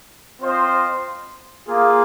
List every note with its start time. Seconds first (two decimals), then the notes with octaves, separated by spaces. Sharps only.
0.40 C4 F4 C5 D#5
1.68 A#3 F4 G#4